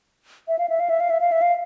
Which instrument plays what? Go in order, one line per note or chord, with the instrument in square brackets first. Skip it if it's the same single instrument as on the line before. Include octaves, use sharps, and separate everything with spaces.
[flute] E5
F5
E5
F5
E5
F5
E5
F5
E5
F5